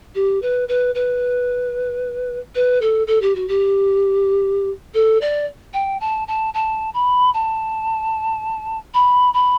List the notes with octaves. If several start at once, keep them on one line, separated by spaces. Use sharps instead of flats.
G4
B4
B4
B4
B4
A4
A4
G4
F#4
G4
A4
D5
G5
A5
A5
A5
B5
A5
B5
B5